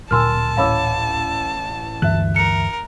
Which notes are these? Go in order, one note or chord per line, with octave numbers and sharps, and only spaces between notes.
D1 A#2 A#4 G#5 A5 C6 E6 F6
A1 C#5 F5 B5 D6 E6
D2 G2 E3 E5 F#6
A#4 C#7